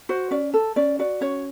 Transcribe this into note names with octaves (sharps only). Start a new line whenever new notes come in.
F#4 C5
C#4 D5
A4
C#4 D5
F#4 D5
C#4 C#5